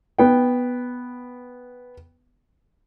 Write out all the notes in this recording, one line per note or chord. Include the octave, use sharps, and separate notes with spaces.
B3 G5